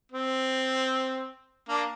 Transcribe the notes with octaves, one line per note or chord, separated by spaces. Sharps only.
C4
A#3 D4